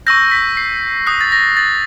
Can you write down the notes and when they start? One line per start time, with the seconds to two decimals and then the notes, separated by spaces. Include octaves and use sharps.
0.07 C#6 E6 G6 A#6
0.31 B6
0.57 C7
1.06 D#6 F#6 C7
1.21 A6
1.32 A#6
1.57 A6